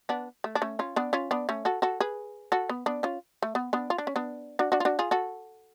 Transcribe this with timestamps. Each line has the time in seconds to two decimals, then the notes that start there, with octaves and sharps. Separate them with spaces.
0.09 B3 D4
0.44 A3
0.55 D4
0.62 A3 C#4
0.79 C#4 F4
0.96 B3 D4
1.13 C#4 F4
1.31 B3 D4
1.49 A3 C#4
1.65 F#4 A4
1.82 F#4 A4
2.00 G#4 B4
2.52 F#4 A4
2.69 B3
2.86 B3 D4
3.03 C#4 F4
3.42 A3
3.55 B3
3.73 B3 D4
3.90 F4
3.98 D4
4.07 C#4
4.16 B3 D4
4.59 D4 F#4
4.72 D4 F#4
4.80 F4
4.85 D4 F#4
4.99 F4 G#4
5.11 F#4 A4